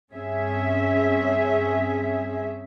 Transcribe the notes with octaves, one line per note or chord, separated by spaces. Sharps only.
G2 C4 C#4 G#4 E5